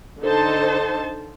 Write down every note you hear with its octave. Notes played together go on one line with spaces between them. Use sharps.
D3 D#4 A4 C5 A5